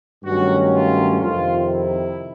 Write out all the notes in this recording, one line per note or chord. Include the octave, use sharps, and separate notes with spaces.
G2 D#3 F#3 A3 C#4 F#4
F4
F2 C3 D#3 F4
E4